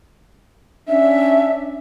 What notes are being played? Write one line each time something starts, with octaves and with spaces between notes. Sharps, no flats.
C#4 D4 E5